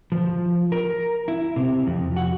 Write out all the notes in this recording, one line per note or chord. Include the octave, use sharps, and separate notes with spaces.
F3
A#4
E4
C3
F2
F#4